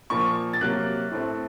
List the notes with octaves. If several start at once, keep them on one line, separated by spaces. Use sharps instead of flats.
A#2 F3 A#3 C#6
A6
C3 F#3 A#3 F#6
A2 A3 C4